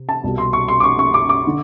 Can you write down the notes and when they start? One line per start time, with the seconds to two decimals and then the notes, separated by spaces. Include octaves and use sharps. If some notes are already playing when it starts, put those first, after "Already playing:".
Already playing: C3
0.09 A5
0.24 C2 B2
0.38 C6
0.53 C#6
0.68 C6
0.80 D6
0.84 C#6
0.99 C#6
1.14 D6
1.29 D6
1.47 D3